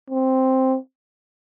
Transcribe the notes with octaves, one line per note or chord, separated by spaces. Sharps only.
C4